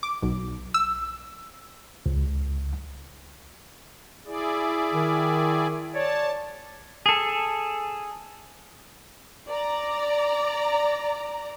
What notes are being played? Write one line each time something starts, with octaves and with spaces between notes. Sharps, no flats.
D6
B1
E6
C#2
E4 G#4 D5
D#3
C#5 D5 A5
G#4 A4
D5 A#5